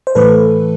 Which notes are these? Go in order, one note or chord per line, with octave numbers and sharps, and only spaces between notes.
C5
A2 E3 A3 A4 B4